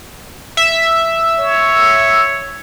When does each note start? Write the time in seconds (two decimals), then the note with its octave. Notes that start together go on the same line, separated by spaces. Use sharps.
0.57 E5
1.39 C#5